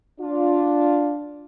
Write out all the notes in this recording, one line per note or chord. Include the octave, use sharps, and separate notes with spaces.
D4 F4